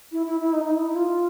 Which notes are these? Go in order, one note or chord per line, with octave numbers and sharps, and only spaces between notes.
E4
E4
E4
D#4
D#4
E4
F4